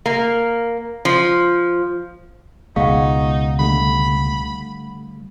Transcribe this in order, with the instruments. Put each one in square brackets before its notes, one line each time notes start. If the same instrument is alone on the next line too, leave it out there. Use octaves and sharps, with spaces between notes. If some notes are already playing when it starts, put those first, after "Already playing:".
[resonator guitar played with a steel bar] A#3
F3
[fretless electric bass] C#2 B2 G#3 [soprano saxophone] D#4 [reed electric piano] D#5 C#6 [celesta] F5 F#5
[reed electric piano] D3 G3 A3 [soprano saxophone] B5